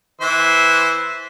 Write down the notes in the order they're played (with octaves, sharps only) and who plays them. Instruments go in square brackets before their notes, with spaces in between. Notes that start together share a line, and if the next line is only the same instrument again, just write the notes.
[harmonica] E3 C5 E5